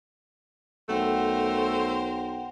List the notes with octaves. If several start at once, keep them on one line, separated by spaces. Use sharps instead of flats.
B1 A3 A#4 C5 F#5 G5